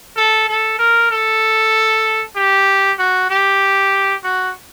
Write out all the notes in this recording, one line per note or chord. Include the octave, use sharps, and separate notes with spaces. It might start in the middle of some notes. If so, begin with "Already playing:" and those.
A4
A4
A#4
A4
G4
F#4
G4
F#4